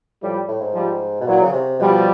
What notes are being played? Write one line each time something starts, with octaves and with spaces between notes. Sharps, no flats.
A2 F3 G3
A2
G#2
F3 G3
B2
A#2 E3 F#3
C#3
C3
B2 F3 G3